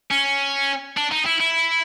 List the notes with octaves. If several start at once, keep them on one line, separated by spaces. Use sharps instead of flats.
C#4
D4
D#4
E4
E4